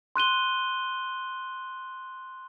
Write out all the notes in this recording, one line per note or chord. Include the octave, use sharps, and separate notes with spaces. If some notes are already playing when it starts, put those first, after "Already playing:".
C6 F#6 D#7 G7